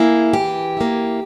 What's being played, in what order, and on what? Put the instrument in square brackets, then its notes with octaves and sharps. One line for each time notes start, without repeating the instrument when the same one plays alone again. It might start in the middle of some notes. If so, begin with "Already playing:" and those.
Already playing: [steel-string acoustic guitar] A#3 E4 G#4
E3 G4
A#3 E4